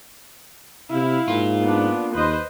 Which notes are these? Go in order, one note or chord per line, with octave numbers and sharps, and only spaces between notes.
C3 E4 F5
G#2 A#3 F4
B3 D4
D#2 B4 C5 D#5